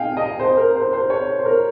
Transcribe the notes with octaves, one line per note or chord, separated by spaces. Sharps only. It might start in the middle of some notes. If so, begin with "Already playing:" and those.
Already playing: D#5 F5 G5 G#5
D#5
C5
A#4
C5
C5
C#5
C5
A#4